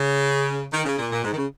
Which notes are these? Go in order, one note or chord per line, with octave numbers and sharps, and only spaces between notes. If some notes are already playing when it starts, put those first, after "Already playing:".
Already playing: C#3
D#3
C#3
A#2
A#2
G#2
D#3
C#3